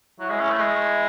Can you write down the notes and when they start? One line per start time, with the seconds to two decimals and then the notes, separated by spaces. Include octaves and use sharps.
0.20 F#3 E4
0.30 G#3
0.40 C#4
0.50 A3
0.60 G#3